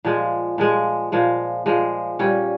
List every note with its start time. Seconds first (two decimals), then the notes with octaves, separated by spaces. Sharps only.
0.05 A#2 F3 G#3
0.58 A#2 F3 G#3
1.12 A#2 F3 G#3
1.66 A#2 F3 G#3
2.19 A#2 G3 C#4